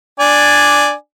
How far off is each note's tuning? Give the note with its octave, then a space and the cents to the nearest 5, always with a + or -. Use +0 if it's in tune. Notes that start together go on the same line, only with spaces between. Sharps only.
D4 +0 D5 +0 G#5 +0